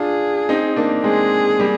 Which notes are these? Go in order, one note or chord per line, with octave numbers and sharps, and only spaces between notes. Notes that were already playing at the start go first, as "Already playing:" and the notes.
Already playing: D4 F4 G#4
C4 D#4
A#3 D4
G#3 C4 G#4
G3 A#3